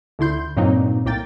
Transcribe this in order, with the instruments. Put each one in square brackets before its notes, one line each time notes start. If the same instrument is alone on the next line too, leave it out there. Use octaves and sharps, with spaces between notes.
[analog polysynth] D2 D3 E4 C6 G6
G2 A#2 F#3 A#3 C4 D#4
C2 A2 A#3 G5 A6